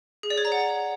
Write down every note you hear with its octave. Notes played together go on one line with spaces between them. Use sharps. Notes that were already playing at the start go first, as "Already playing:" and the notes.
G#4
D5
C#5
A#5
F#5